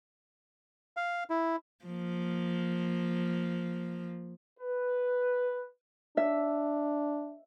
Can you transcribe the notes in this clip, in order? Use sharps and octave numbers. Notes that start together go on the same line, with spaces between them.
F5
E4
F3 A#3
B4
D4 E5